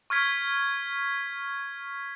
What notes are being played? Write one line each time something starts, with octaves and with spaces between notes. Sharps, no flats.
C#6 F6 G#6 B6